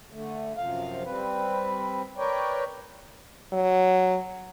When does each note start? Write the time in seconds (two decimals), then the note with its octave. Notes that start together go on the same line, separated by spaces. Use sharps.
0.12 D3 A3
0.57 F#2 C3 F3 F5
1.05 G3 C4 B4
2.17 A#4 B4 C#5 D5 G5
3.53 F#3